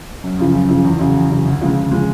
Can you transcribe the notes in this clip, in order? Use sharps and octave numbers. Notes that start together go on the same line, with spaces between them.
F#2
C#3 F3
F#2
C#3 F3
E2
C#3 F#3
E2
C#3 F#3
D2
C#3 F3 G#3
D2
C#3 F3 G#3